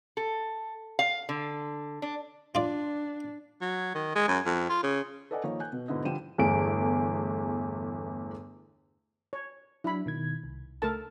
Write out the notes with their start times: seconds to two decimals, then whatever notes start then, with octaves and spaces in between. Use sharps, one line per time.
0.17 A4
0.99 F5
1.29 D3
2.02 D4
2.55 D4 F4 D5
3.62 F#3
3.95 D#3
4.15 G#3
4.28 F#2
4.46 F2
4.70 F4
4.83 C#3
5.31 A4 B4 D5 D#5 F#5 G#5
5.44 D#3 F3 A#3 C#5 D#5
5.60 G#5 F#6 G6
5.73 B2
5.88 G#2 B2 D3 E4 D#5
6.05 D3 F3 G3 G5 D#7 E7
6.38 G1 E2 A3 G#4 D7
9.33 C#5
9.84 F#3 D4 E4 B5
10.06 B2 D#3 G#6
10.43 C2
10.82 C#2 A3 A4 A#4 A5